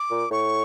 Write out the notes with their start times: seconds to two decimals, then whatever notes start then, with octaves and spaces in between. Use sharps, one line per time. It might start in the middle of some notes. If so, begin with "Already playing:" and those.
Already playing: D6
0.11 A#2
0.31 A2 C#6